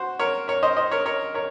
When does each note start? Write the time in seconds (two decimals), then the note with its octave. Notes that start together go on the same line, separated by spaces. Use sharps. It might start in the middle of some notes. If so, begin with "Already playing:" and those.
Already playing: F#4 C5
0.19 A#4 C#5
0.48 A#4 C#5
0.63 C5 D#5
0.77 C5 D#5
0.91 A#4 C#5
1.06 A#4 C#5
1.34 A#4 C#5